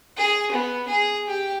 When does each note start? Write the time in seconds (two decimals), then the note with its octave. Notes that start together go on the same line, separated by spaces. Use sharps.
0.17 G#4
0.52 B3
0.88 G#4
1.27 G4